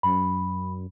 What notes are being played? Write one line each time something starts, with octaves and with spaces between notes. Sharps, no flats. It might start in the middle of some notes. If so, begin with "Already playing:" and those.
F#2 B5